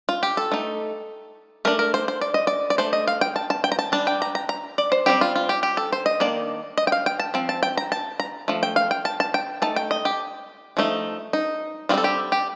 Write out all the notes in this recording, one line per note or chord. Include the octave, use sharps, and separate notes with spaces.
F4
G4
A4
A3 D#4
A3 D4 A#4
A#4
C5
C5
D5
D#5
D5
D5
A3 D4 C5
D#5
F5
G5
A5
A5
G5
A#5
A5
G3 D4 A5
G5
A#5
A#5
A#5
D5
C5
G3 C4 D#4 G4
F4
F4
G4
G4
A4
C5
D#5
D#3 A#3 D4 D5
D#5
G5
F5
G5
A5
F3 C4
A5
G5
A#5
A5
A#5
F3 A3
G5
F5
G5
A5
A5
G5
A3 D#4 A5
G5
D#5
G4
F3 A3 D#4
D#4
G3 C4 D#4 F4
A4
G4
G4